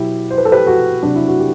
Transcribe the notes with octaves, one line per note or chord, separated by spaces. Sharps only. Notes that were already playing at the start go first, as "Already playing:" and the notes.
Already playing: B2 F#3 E4 G4
C5
B4
A4
G4 B4
F#4 A4
C3 F#3 D4
E4
F#4
G4